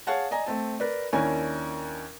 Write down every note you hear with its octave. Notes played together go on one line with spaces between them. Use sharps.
G#4 C#5 F5 F#5 A5
D5 D#5 G#5 A#5
A3 C4 A5
A#4 B4 D5
D#2 C#4 D4 E4 A#4 G#5